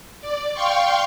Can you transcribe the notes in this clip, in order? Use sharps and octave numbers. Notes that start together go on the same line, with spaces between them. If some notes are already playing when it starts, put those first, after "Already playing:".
D5
F5 G5 C6 C#6